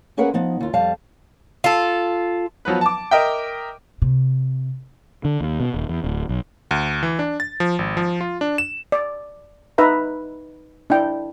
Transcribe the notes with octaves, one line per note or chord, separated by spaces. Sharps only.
A#3 C#4 G#4 A#4 B4 F#5
F3 B3 D#4
D#2 F4
F2 G3 F5 A5
F4 A4
F3 F#3 B3 B4
A5 D6
A#4 D#5 E5 G5
C3
D3
D#2
B2
D#1
E2
D1
B1
D2
E3
D4
A6
F3
G#1
F3
F4
D4
E7
D5
D#4 B4 E5 A#5
D4 E4 G5